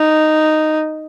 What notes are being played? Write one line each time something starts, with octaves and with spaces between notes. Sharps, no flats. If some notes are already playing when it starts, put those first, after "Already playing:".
Already playing: D#4